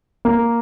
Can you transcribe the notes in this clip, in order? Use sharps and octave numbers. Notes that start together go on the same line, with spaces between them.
A#3